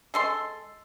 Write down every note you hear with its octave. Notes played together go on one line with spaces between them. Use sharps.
G#3 A4 C6